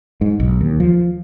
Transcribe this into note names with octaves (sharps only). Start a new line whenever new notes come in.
G#2
B1
D#2
F3